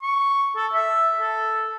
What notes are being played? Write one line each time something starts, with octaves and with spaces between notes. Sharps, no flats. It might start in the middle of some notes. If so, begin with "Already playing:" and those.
C#6
A4
E5
A4